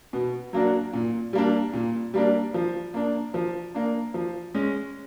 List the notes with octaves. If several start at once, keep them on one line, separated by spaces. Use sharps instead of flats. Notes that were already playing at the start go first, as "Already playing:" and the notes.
B2
F#3 A#3 D4 F#4
A#2
G3 A#3 D4
A#2
G3 A#3 D4
F3
A#3 D4
F3
A#3 D4
F3
G#3 C#4